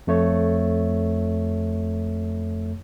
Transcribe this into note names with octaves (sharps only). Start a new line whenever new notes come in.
F2 A3 C#5